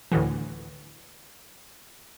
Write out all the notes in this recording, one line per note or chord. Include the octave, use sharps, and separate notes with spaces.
D2 A2 D3 E3